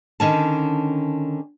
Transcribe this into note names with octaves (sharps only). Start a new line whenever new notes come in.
D3 D#3 C#4 A5